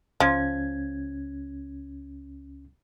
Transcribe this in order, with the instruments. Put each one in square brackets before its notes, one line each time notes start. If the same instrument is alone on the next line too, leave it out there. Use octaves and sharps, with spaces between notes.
[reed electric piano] C#2 C#4 G#6 [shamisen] F3